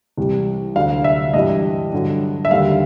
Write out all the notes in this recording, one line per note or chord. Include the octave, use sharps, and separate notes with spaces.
C2 C3 E3 G3
D2 D3 F#3 F5
E5
G2 E3 G3 D#5
G2 D3 F#3
E5
D#2 D3 G3 F5